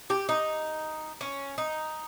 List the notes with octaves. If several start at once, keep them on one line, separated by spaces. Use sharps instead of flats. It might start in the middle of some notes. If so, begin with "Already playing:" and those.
G4
D#4
C#4
D#4